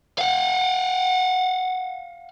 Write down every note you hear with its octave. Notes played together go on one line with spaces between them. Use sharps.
F5 F#5